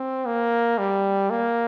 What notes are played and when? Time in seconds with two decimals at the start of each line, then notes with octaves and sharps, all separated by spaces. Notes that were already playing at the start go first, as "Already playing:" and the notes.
Already playing: C4
0.26 A#3
0.78 G3
1.30 A#3